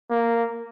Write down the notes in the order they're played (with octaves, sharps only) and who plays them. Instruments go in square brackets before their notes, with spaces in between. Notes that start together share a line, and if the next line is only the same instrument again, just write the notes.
[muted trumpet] A#3